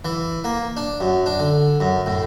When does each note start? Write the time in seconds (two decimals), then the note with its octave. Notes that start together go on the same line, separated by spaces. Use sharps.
0.05 E3
0.44 A#3
0.77 D4
1.00 F#2
1.26 D4
1.39 D3
1.80 F#2
2.06 A2